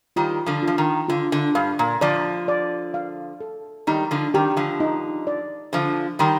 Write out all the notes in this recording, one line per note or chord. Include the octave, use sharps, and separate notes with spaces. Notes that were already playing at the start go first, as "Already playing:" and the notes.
D#3 G3 F4
D3 F3
F4
F3
D#3
D3 F4
D3
G2 F5
A#2
D3 F3 D5
D5
F5
A4
D#3 G3 D#4
D3 F3
D#3 G4
D3 F3
D#4
D5
D3 F3 C5
D#3 G3 C6